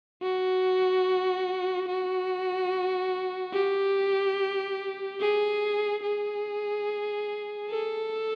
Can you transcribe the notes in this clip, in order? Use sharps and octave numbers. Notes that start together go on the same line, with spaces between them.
F#4
F#4
G4
G#4
G#4
A4